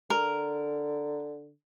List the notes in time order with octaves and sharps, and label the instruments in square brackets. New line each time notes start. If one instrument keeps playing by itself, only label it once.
[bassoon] D3 [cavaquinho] A#4